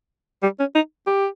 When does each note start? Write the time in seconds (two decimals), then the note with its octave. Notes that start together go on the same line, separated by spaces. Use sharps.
0.43 G3
0.59 C#4
0.75 D#4
1.07 G4